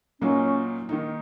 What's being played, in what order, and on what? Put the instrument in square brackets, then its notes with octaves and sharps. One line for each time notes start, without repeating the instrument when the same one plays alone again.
[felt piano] A#2 F#3 A#3 D#4 [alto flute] C#4
[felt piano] D#3 A#3 D#4